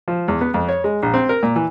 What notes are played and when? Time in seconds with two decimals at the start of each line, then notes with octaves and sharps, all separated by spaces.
0.08 F3
0.28 E2
0.41 B3
0.54 F2
0.69 C#5
0.84 G#3
1.03 A#1
1.14 C4
1.29 A#4
1.43 A#2
1.56 E3